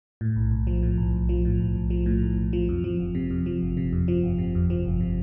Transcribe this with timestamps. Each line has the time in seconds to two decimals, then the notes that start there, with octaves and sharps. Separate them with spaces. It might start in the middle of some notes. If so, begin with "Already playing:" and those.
0.21 A2
0.36 B1
0.51 B1
0.67 F3
0.83 A2
0.98 B1
1.14 B1
1.29 F3
1.45 A2
1.60 B1
1.76 B1
1.90 F3
2.06 A2
2.23 B1
2.37 B1
2.53 F3
2.69 F2
2.84 F3
2.99 G1
3.15 C3
3.30 F2
3.46 F3
3.62 G1
3.77 C3
3.93 F2
4.08 F3
4.23 G1
4.38 C3
4.55 F2
4.70 F3
4.86 G1
5.00 C3